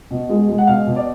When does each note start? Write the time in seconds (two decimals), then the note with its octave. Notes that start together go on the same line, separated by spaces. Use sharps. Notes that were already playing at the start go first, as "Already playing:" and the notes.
0.11 B2
0.29 G#3
0.48 G#3
0.58 F#5
0.67 B2 F5
0.87 B2
0.96 D5